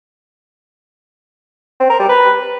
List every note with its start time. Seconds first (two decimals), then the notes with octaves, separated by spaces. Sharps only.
1.80 C4
1.90 A#4
1.99 G3
2.09 B4